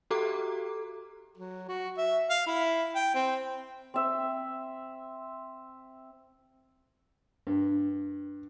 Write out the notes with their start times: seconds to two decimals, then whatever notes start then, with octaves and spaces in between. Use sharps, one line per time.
0.10 F#4 G4 A4 A#5 D6
1.37 F#3
1.68 F#4
1.97 E5
2.30 F5
2.47 E4
2.95 G5
3.15 C4
3.94 C4 E5
7.47 G2